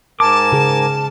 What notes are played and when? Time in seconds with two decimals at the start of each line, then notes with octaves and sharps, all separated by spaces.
0.20 G#2 A#4 G#5 A5 D6
0.52 C#3 G#4